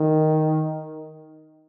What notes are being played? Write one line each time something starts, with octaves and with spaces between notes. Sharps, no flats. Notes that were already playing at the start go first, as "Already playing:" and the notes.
Already playing: D#3